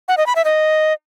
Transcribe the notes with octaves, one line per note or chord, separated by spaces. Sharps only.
F#5
D#5
B5
E5
D#5